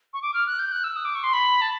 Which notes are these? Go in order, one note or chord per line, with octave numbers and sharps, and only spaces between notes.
C#6
D6
F6
F#6
G6
F#6
E6
D#6
D6
C#6
C6
B5
A5